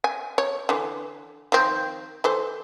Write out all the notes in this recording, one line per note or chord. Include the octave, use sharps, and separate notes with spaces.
G#5
C#5
D3 E3
D#3 F3 C4
E3 A4 C5